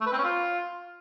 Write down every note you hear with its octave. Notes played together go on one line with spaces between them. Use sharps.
A3
B4
C4
C#4
F4